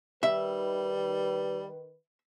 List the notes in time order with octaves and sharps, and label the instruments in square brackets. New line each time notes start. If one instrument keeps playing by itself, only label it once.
[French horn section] D#3 B4 [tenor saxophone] G3 [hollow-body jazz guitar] E5